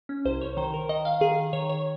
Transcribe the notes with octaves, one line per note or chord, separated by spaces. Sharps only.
C#4
C2 C5
C#5
D#3 C5
A#4
D#3 D#5
F5
D#3 G#4
D#3 C#5
C#5